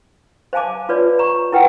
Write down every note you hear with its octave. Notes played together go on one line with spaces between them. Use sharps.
C5 F5 G#5 A5 D6
F4 B4 C#5 D5
A#5 C#6
E4 A#4 B4 F#5 G5